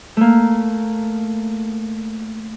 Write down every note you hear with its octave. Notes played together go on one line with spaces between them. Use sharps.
A3 A#3